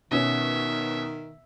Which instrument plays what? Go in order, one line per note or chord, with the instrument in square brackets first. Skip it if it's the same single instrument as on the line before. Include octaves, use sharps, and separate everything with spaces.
[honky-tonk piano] B2 C#4 [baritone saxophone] D#3 [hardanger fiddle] E5